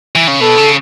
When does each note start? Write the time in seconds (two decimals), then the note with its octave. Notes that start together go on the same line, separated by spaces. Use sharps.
0.15 E3
0.28 C#3
0.40 B2 A4
0.58 C#3